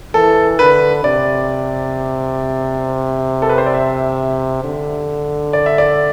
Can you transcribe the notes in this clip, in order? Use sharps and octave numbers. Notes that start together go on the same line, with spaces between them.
E3 A4
D3 B4
C3 D5
A4
B4
C5
D5
E5
D3
D5
E5
D5